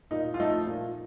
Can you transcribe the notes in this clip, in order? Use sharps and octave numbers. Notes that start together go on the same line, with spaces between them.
A#2 D#4
F4
F3 A3 D#4
A#2